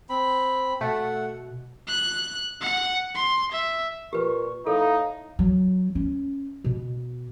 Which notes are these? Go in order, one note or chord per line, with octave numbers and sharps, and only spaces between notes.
C4 B5
B2 A3 F#5
F#6
F#5
C6
E5
A#2 G4 B4 C#6
A2 D#4 A4 F5
F#3
C#4
B2